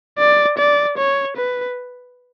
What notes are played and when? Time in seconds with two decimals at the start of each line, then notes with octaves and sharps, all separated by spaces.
0.18 D5
0.58 D5
0.98 C#5
1.37 B4